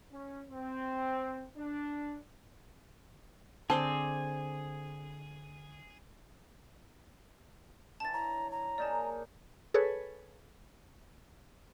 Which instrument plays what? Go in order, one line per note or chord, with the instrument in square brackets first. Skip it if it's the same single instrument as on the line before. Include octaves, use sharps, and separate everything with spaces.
[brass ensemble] C#4
C4
D4
[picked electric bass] D3 [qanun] C4 C5 D5 [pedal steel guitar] G#4 [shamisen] A5
[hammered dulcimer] D3 E3 [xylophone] A5 A6
[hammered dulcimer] C#5 [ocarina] A#5
[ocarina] A#5
[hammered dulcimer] A#3 D#4 G#4 [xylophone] D5 A5
[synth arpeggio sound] G#4 A4 B4 C#5